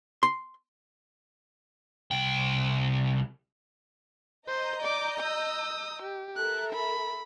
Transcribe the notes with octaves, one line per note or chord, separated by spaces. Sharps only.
C6
C2 G5
C5 D#5 A#5 G6
D5 D6
D#6 E6
G4
A4 A#4 E5 F#6
B5